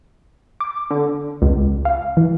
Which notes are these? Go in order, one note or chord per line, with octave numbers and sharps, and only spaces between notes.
D6
D3
C#2
F5
E3